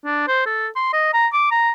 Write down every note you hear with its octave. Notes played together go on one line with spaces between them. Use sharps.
D4
C5
A4
C6
D#5
A#5
D6
A#5